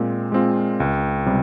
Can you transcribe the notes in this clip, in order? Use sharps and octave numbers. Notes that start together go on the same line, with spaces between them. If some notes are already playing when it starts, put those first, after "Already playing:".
Already playing: A#2 G#3 C4
G#3 C4 F4
C#2
C3 G3